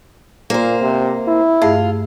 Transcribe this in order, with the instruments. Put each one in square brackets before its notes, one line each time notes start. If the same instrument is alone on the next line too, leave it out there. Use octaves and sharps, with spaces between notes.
[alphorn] A#2 [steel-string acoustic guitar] A#3 C5
[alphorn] C3
E4
[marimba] G2 A3 G#4 [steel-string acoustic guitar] F4